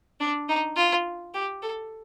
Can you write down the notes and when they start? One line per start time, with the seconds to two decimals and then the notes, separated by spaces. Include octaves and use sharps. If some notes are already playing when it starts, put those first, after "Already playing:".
0.20 D4
0.49 D#4
0.76 F4
1.34 G4
1.62 A4